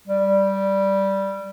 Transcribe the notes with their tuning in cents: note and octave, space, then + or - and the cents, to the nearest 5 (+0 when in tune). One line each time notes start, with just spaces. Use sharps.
G3 -5